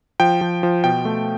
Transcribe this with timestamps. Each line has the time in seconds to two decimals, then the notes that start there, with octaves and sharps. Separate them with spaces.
0.20 F3 G5
0.41 F3
0.63 F3
0.84 B2 G5
1.05 A3